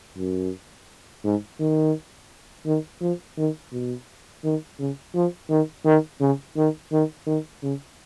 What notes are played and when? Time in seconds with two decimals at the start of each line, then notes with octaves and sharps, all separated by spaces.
0.18 F#2
1.24 G#2
1.60 D#3
2.66 D#3
3.01 F3
3.38 D#3
3.72 B2
4.44 D#3
4.79 C#3
5.15 F3
5.49 D#3
5.85 D#3
6.21 C#3
6.57 D#3
6.92 D#3
7.27 D#3
7.63 C#3